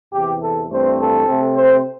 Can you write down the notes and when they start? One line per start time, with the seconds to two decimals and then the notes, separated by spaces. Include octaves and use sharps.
0.13 E2 C3 E3 G4
0.42 A4
0.70 G2 E3 A3 C4 C5
0.98 A4
1.27 C3 A3 C4
1.55 C5